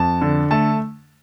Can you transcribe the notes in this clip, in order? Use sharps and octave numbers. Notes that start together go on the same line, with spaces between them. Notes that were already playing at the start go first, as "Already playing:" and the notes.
Already playing: F2 A5
D3
A3 A5